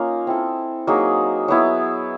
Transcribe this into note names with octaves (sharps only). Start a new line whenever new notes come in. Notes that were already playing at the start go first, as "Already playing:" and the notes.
Already playing: A#3 C#4 D#4 F4
C4 E4 A4
F#3 A#3 D#4 G#4
F#3 B3 E4